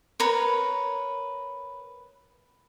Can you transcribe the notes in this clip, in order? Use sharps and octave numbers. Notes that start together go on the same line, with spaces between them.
A#4 B4 C#5